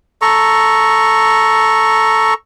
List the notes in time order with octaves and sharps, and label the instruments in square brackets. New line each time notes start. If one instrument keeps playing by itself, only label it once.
[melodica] A4 A#5 C#6